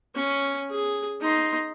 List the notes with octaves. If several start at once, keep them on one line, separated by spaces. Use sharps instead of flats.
C#4
G#4
D#4 C6